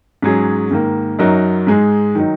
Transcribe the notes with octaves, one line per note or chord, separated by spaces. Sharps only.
G#2 F#3 C#4 G#4
G#2 D#3 A#3
F#2 F#3 D#4 F#4 A#4
G#2 G#3 D#4 G#4
D#3 F#3 D#4